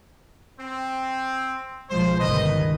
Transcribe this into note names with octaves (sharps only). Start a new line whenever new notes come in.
C4
B1 F3 G#3 C5
G1 C#2 D#3 B4 D#5